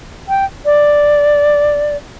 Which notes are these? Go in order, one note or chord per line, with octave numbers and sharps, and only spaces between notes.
G5
D5